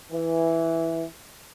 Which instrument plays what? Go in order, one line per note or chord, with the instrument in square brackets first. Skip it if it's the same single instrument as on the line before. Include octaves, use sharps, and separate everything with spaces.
[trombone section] E3